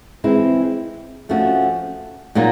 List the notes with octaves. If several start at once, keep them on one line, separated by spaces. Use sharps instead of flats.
E3 G#3 C4 E4
F3 A3 C#4 F#4
A#2 F#3 A#3 D#4